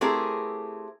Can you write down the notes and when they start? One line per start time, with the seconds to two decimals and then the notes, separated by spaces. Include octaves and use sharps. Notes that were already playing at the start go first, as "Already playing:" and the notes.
0.01 A3 C4 E4 G4 G#4 A#4